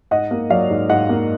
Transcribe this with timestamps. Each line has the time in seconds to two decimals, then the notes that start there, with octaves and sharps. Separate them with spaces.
0.11 G#2 D#5 F#5
0.31 A#3
0.50 F#3 D5 F5
0.70 G#2
0.89 G#2 D#5 F#5
1.09 A#3